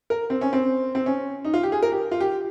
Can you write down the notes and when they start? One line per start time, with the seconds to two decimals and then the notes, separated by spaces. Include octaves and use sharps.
0.10 A#4
0.30 C4
0.41 C#4
0.53 C4
0.95 C4
1.06 C#4
1.45 D#4
1.54 F4
1.63 G4
1.72 G#4
1.82 A#4
1.92 G4
2.12 F4
2.20 G4